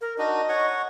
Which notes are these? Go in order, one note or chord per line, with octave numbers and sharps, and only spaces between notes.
A#4
D4 D#4 F#4 D#5
C#5 F#5 C#6